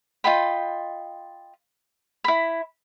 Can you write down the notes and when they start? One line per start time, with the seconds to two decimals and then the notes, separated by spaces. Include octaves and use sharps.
0.24 F4 D#5 G5 B5
2.24 E4 B5